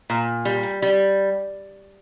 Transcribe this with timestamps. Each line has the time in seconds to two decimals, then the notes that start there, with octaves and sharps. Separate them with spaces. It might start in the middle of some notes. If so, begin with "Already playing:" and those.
0.10 A#2
0.45 G3
0.82 G3